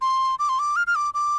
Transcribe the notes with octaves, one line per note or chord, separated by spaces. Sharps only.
C6
D6
C6
D6
F6
F6
D6
D6